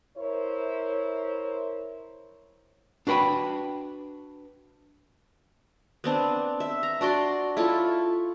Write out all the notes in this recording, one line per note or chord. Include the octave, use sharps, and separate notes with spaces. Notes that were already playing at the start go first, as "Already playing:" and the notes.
E4 A#4 C5 C#5
D4 F#4 B4 G5 B5
B3 C4 D4
E5
A#5
D4 F#4 D5 C6
E4 F4 A4 C#5